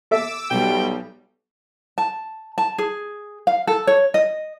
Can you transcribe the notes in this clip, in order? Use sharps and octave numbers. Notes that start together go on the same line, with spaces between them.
A4 E5 D6 E6
B1 B2 G3 G5
A5
A5
G#4
F5
A4
C#5
D#5